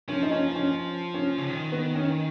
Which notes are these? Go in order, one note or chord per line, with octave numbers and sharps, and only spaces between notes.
F3 C#4
D#4
C#4
C#4
C#4
C#3
D#3
B3
C#4